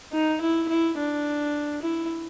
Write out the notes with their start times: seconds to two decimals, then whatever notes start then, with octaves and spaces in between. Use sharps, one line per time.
0.12 D#4
0.41 E4
0.69 E4
0.97 D4
1.82 E4